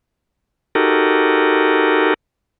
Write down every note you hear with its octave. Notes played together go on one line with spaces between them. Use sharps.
D#4 F#4 G4 A4 A#4